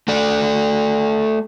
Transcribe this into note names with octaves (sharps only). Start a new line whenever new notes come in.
A3 A4 D5